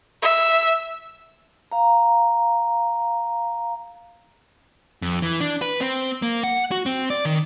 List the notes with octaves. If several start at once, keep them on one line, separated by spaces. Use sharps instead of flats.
E5
F5 A#5
F2
E3
D4
B4
C4
A#3
F#5
F#4
C4
D5
D#3